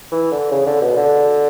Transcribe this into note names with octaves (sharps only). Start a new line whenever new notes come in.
E3
D3
C#3
D3
B2
D3